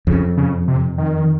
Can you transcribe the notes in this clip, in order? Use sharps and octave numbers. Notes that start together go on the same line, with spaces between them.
F2 C#3
C#3
C3
D#3